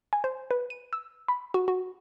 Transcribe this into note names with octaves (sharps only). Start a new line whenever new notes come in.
G#5
C5
B4
D#7
E6
B5
F#4
F#4